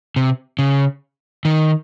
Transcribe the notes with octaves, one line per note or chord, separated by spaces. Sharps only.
C3
C#3
D#3